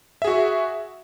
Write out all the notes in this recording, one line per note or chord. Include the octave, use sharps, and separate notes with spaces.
F#4 G#4 E5